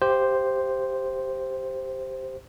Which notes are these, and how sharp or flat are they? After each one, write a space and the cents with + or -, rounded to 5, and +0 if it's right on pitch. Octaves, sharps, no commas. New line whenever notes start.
G4 +0 C5 +0 F5 -30